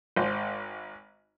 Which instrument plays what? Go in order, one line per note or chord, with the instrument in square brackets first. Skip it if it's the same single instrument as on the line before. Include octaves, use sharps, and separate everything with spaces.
[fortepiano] G#1 C5